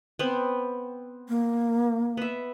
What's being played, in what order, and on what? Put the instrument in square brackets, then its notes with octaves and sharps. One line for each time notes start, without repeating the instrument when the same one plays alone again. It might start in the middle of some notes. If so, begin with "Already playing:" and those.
[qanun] B3 C4
[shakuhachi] A#3
[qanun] B3 E5